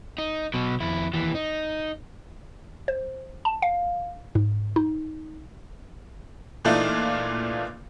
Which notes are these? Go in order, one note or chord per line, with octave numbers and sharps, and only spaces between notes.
D#4
B2 F#3
F2 E4
D#2 E3
D#4
C5
A5
F5
G#2
D#4
A#2 E3 A3 D4 D#4 F4